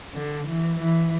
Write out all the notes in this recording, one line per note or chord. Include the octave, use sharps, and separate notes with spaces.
D3
E3
E3